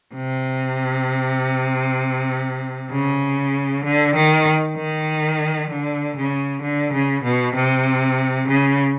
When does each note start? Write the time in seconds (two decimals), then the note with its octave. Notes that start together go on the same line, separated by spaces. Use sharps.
0.14 C3
2.91 C#3
3.85 D3
4.16 D#3
4.77 D#3
5.70 D3
6.17 C#3
6.62 D3
6.93 C#3
7.24 B2
7.55 C3
8.48 C#3